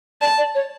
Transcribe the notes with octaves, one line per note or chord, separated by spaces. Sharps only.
D5 A5
D5
C#5